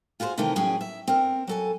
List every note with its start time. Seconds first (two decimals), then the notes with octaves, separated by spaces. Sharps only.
0.20 F4 F#4 G#4 B4 C5
0.38 C3 D#3 E3 A3 A#4
0.56 A2 F#3 C#4 G#4 G5
0.81 E5
1.07 C4 A#4
1.47 F#3 A4 G#5